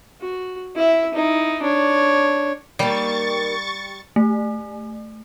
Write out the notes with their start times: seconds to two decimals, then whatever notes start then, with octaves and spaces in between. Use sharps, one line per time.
0.21 F#4
0.76 E4 E5
1.14 D#4 E4
1.62 D4 C#5
2.79 D#3 G3 A#3 C#6 A6
4.16 A3